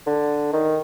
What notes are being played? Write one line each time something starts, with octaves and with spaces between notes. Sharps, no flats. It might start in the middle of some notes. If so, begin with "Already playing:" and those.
D3
D#3